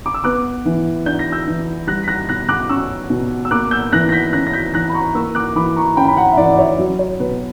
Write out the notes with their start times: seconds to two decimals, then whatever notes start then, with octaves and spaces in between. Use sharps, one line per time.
0.06 D6
0.14 E6
0.24 B3 D6 F#6
0.65 E3
1.06 D4 G6
1.19 A#6
1.32 E6 G6
1.47 E3
1.87 G3 F#6 A#6
2.03 B6
2.08 F#6 A#6
2.29 B2 F#6 A#6
2.49 D6 F#6
2.69 C#4 C#6 E6
3.10 B2
3.45 E6
3.51 A#3 D6 F#6
3.71 E6 G6
3.92 E3 F#6 A#6
4.09 A#6
4.12 G6 B6
4.33 C#4 F#6 A#6
4.47 A#6
4.53 G6 B6
4.74 E3 F#6 A#6
4.89 B5
4.94 A#5 C#6
5.15 A#3 C#6 E6
5.35 D6 F#6
5.56 E3 B5 D6
5.76 A#5 C#6
5.97 C#4 G5 B5
6.08 B5
6.17 F#5 A#5
6.32 E5
6.37 E3 D5 F#5
6.53 D5
6.58 C#5 E5
6.78 F#3
6.99 C#5
7.20 B2 B4